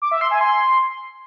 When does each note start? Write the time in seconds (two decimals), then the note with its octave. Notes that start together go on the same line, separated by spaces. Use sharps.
0.02 D6
0.11 E5
0.21 C6
0.31 G#5
0.41 C6